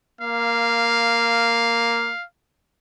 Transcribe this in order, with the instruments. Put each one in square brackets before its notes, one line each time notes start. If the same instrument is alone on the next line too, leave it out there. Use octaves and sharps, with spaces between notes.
[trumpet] A#3 [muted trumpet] F5